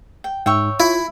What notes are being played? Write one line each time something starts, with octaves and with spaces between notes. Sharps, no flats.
G5
G#2 C#5 E5 G5
E4 F4